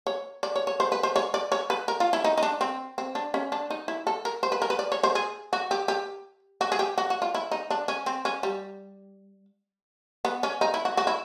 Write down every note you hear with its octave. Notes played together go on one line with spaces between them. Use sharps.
C#5
D5
C#5
C#5
C5
B4
C5
C#5
D5
C#5
B4
A#4
F4
E4
D#4
D#4
D4
C4
C4
D4
C#4
D4
D#4
E4
A4
A#4
C5
B4
A#4
B4
D5
C#5
C5
G#4
F#4
G4
G4
F#4
G#4
G4
F#4
F#4
F4
E4
D#4
D4
C#4
C4
C#4
G3
B3
C#4
D#4
E4
F#4
F#4
E4